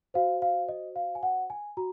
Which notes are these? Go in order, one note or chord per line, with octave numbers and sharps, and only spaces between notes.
F#4 C5 F5
F5
D#5
F5
G#5
F#5
G#5
F#4 A#5